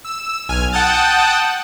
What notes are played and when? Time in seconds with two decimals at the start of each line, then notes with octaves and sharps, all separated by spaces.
0.04 E6
0.49 B1 G#5 F6
0.73 F#5 G5 A5 D#6 G6 A6